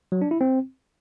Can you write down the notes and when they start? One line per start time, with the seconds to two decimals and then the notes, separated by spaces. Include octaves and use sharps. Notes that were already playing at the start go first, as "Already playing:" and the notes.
0.12 F#3
0.22 D4
0.31 E4
0.41 C4